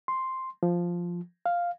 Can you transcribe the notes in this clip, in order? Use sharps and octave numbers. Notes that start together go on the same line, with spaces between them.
C6
F3
F5